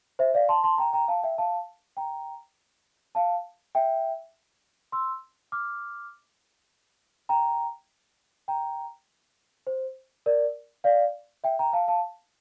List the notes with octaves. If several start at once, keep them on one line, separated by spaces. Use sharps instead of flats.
C5 E5
D5 F5
A5 C6
A5 C6
G5 A#5
G5 A#5
F5 A5
E5 G5
F5 A5
G5 A#5
F5 A5
E5 G5
C6 E6
D6 F6
G5 A#5
G5 A#5
C5
A#4 D5
D5 F5
E5 G5
G5 A#5
F5 A5
F5 A5